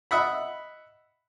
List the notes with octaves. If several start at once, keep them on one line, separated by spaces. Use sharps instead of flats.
D#5 E5 F#5 B5